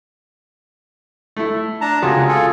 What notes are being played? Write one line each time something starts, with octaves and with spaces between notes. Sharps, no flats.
A3 E4
D4 A5 A#5
C#2 C3 F4 F#4 G#4
F4 G#4 A4